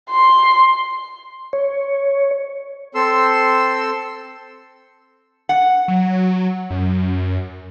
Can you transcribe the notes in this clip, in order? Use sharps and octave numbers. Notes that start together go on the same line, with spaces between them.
C6
C#5
C4 A4 C6 E6
F#5
F#3
F#2